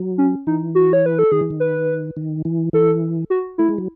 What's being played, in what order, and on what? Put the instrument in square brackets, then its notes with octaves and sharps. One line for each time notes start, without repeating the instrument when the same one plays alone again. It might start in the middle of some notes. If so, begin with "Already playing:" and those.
Already playing: [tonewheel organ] F#3
[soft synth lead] C#4
[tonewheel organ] E3 [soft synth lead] D#4
[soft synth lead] F#4
C#5
B4
A4
[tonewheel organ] D#3 [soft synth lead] G#4
[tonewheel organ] E3
D#3
[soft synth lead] B4
[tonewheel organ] D#3
E3
[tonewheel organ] E3 [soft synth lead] A4
[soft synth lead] F#4
[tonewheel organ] A3 [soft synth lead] E4
[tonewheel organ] G#3
F#3